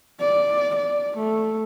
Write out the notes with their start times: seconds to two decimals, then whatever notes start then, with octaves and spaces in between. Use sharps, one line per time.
0.20 D5
0.76 D5
1.18 A3